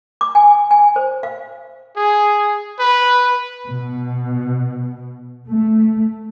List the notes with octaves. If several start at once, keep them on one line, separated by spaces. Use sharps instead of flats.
D6
G#5
G#5
C5
F5
G#4
B4
B2
A3